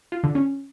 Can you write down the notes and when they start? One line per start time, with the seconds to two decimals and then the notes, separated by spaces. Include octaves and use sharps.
0.12 F4
0.24 D3
0.35 C#4